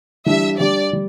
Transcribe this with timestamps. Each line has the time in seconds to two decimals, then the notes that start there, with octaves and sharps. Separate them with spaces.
0.26 E3 G3 D4 G4 E5
0.59 G3 D4 G4 D5
0.93 G3